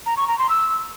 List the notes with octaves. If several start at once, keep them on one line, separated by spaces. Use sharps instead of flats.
A#5
C#6
A#5
C6
E6